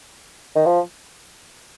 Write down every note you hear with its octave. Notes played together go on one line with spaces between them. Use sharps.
D#3
F3